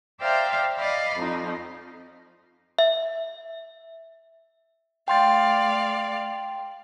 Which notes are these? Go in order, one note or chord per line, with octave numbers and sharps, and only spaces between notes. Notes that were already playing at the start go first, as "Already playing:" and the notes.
C5 D5 E5 F5 G5 A#5
D5 D#5 F5 B5
F2 D#4
E5
A3 D5 F5 G5 C6 A6